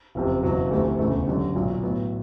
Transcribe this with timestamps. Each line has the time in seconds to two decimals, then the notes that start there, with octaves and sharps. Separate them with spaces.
0.15 F#1 F2 C3
0.43 F#1 E2 B2 F#3
0.71 D2 C3 E3 A3
0.99 E1 D2 C#3 E3 A3
1.27 F#2 D3 G3
1.55 B1 A#2 F#3
1.83 A2 F#3 B3